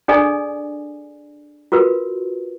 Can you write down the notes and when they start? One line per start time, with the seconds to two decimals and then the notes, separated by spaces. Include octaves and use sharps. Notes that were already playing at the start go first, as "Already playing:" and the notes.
0.08 D4 G#4 A4 D5 D#5 G#5
1.72 F4 F#4 A#4 B4